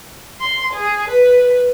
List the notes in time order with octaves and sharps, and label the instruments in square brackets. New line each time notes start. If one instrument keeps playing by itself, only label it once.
[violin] C6
G#4
B4